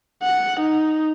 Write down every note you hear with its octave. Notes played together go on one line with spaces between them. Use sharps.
F#5
D#4